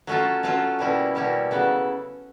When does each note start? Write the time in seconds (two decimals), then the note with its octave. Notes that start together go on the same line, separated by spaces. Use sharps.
0.07 F#3 A3 C#4 F4 A4
0.43 F#3 A3 C#4 F4 A4
0.79 B2 G3 A#3 C#4 E4
1.15 B2 G3 A#3 C#4 E4
1.51 C#3 F#3 B3 E4 A4